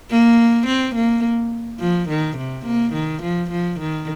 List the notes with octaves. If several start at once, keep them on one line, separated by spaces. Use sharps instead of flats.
A#3
C4
A#3
F3
D#3
C3
A#3
D#3
F3
F3
D#3